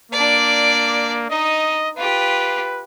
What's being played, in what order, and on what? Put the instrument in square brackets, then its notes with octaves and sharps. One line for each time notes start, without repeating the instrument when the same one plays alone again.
[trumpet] A#3 [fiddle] D4 D5
[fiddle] D#4 [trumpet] D#5
[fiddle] F4 G4 [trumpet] B4